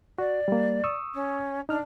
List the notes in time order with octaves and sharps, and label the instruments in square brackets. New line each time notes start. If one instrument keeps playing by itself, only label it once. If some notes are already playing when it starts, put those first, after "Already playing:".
[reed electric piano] F#4 [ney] D5
[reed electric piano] G3 A#3
C#6 D#6 E6
[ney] C#4
[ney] D4 [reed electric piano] D#4 F6